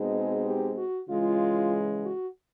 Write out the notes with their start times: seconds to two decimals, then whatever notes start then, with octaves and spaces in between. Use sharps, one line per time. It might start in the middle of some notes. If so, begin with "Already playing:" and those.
Already playing: B2 G#3 C4 D#4
0.14 G#4
0.46 G4
0.77 F#4
1.10 C#3 E3 G#3 F4
2.05 F#4